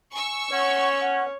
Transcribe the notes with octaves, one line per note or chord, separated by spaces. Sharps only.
G#5 C#6 E6
C#4 C#5 F#5
F#5